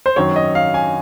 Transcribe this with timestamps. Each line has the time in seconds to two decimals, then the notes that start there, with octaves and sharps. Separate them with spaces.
0.06 C5
0.16 F#2 D#3 F#3 C#5
0.36 D#5
0.55 F5
0.74 G#5